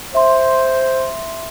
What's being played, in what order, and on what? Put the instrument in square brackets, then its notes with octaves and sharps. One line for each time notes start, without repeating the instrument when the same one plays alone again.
[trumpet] C5 [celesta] E5 C6